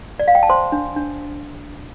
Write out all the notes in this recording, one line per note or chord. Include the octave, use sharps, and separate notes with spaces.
D5
F5
G5
A5
C5 C6
D4
D4